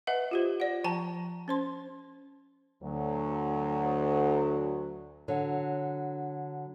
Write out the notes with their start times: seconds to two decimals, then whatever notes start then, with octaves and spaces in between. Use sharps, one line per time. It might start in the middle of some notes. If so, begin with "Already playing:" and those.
0.07 B4 D#5 E5 F#5
0.31 F4 G4 C5
0.60 D5 F#5
0.84 F3 G5 A5 A#5
1.48 C#4 C5 C6
2.83 D2 F#3
5.28 D3 F#3